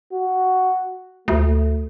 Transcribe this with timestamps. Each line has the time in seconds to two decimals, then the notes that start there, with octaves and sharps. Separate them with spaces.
0.13 F#4
1.28 D2 A3